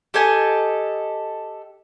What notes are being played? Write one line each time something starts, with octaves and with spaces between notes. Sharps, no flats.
G4 A4 D#5 G#5